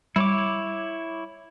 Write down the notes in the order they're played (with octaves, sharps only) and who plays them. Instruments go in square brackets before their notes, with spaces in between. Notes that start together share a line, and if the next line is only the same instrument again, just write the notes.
[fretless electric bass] G3 [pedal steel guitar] E4 C#5 D6